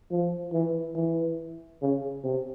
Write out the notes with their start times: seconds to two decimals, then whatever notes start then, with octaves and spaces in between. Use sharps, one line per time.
0.11 F3
0.53 E3
0.95 E3
1.82 C#3
2.24 C3